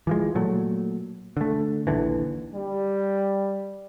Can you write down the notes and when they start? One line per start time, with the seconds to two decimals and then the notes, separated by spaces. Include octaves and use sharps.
0.07 E3 F3 G#3
0.35 A#2 F#3 A3
1.37 D3 A3
1.87 A#1 D#2 D3 E3
2.54 G3